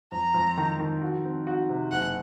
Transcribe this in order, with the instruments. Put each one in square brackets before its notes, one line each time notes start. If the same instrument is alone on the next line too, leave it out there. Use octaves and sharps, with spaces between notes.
[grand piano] F2 [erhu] A#5
[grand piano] F2
D#3
D#3
F#4
C4
F#4
C3
[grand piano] F#1 [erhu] F#5